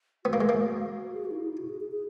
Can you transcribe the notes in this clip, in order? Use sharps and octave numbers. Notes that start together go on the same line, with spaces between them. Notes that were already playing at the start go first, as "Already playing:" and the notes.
B3 F#4
A#3
G#3
A#3
G#4
F#4
D#4
E4
D#4
E4
F#4
G#4
G#4
G#4